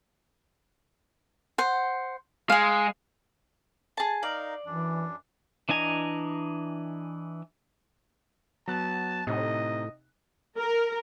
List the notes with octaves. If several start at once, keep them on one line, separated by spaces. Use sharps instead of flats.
C5 F#5
G#3 G#4 F5
G#4 A5
D#4 A#4 D5 F5
F#2 E3 D4
E3 D4 D#5 G#5 A#5
F#3 B3 A5 F#6
A2 C3 D#4 D#5
A#4